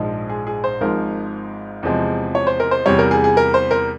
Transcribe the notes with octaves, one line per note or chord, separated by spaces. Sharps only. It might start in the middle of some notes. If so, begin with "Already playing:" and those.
Already playing: A#1 G#2 F3 G#3
G#4
G#4
C5
G#1 G#2 F3 G#3 A#4
E2 C3 F3 G#3
C#5
C5
A#4
C5
E2 C3 G3 C#5
A#4
G#4
G#4
A#4
C5
A#4